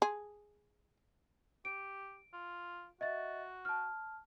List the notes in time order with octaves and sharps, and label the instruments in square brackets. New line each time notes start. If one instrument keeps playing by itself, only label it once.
[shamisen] G#4
[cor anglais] G4 [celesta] D7
[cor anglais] F4
[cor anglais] F#4 [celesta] D#5 E5 A6
[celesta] A5 F6